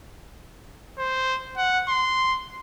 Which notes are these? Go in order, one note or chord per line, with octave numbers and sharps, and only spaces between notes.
C5
F#5
C6